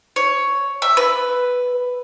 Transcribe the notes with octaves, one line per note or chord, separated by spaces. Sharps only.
C#5
E5
B4